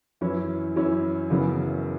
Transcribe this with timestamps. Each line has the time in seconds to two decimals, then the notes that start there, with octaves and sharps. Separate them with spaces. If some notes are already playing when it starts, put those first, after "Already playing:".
0.21 F#2 E3 C#4 E4
0.76 F#2 E3 C#4 E4
1.30 F#1 F#2 C#3 E3 B3